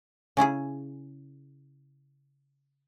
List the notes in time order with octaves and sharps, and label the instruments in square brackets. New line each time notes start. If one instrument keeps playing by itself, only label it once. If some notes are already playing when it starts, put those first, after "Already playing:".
[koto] C#3 C#4 E4 G#4